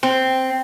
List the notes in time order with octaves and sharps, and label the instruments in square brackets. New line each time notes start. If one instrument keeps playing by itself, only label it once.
[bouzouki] C4